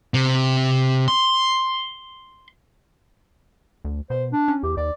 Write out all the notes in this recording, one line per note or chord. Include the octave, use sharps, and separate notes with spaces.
C3
C6
D2
B2 C5
D4
C#4
E2 G4
D#2 D5